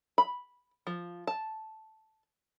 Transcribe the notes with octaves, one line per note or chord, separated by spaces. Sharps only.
B5
F3
A5